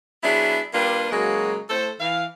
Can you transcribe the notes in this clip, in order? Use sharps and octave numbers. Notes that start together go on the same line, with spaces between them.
F#3 B3 D4 E4 G#4
G3 A#3 D4 F4 G4 B4
C#3 F#3 G#3 A#3 F#4 G#4
A2 A4 C5
E3 F5